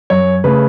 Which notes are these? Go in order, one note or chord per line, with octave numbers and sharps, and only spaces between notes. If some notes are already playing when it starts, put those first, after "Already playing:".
F#2 C#5
C#3 A3 B4